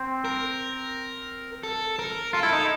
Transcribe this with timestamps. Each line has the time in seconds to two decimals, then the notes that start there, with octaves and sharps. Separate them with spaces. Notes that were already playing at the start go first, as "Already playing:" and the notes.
Already playing: C4
0.25 A#4
1.63 A4
1.99 A#4
2.33 F4 A4
2.43 E4
2.53 D#4